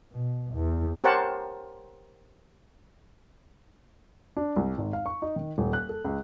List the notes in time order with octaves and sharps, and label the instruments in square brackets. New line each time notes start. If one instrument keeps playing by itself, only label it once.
[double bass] B2
E2
[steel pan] G4 A#4 C5 C#5 F#5 A5
[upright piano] D4
C2
G#1
F5
C#6
D#4
D#3
D#1
F#6
A4
C#2